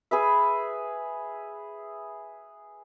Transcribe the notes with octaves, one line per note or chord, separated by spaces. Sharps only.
G#4 B4 E5